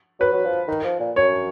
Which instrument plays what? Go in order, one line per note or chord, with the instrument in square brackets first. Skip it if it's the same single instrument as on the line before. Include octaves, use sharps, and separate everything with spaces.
[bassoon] F#3 [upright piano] B4
[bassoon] F#3
F3
D#3
F3
A#2
[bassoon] F#2 [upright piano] C#5